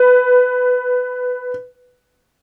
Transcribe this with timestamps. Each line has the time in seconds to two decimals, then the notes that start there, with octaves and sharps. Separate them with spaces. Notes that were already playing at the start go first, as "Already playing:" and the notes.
Already playing: B4